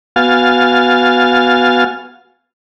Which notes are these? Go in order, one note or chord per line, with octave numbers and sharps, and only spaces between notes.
B3 F#4 F5 G#5 F6 A6